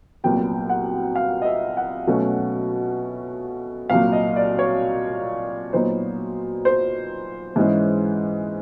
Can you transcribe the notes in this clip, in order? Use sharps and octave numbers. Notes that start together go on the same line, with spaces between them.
C2 A#2 F#3 B3 G5
F#5
F5
D#5
E5
F#5
B2 F#3 A3 C#4
C2 A#2 F#3 F5
D#5
D5
C#5
A#2 F#3 B3 D#4 C5
C5
G#2 E3 G#3 C#4